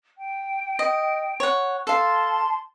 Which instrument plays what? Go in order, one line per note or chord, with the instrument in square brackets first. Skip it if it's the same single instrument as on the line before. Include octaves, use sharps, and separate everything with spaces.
[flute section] G5
[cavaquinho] D#5
C#5 F#5
[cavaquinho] A4 F5 [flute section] A5 C6